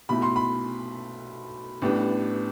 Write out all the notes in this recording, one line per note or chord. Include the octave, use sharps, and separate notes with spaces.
B1 B2 A3 E4 B5
C6
B5
A1 A2 G3 B3 D4